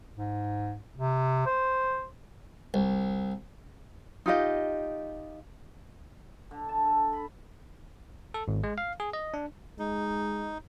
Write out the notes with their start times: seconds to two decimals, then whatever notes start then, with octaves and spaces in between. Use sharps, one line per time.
0.15 G#2
0.95 C3
1.46 C5
2.74 C2
4.26 D#4 F4 G4 D#5
6.51 D3
6.69 A5
6.85 A4
7.13 B5
8.34 A4
8.48 G#1
8.64 G#3
8.78 F5
9.00 G#4
9.13 D#5
9.34 D4
9.79 G#3 D#4